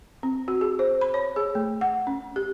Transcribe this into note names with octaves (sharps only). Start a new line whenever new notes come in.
C4
F#4
G#4
C5
B5
C#5
G#4
A3
F#5
C#4
G4